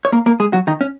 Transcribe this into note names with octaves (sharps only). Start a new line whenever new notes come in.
C#5
A#3 A#4
A#3 A#4
G#3 G#4
F#3 F#4
D#3 D#4
C#4